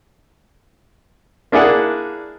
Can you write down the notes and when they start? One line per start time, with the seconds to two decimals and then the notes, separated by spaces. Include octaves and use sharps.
1.52 A#3 D4 E4 G#4 F#5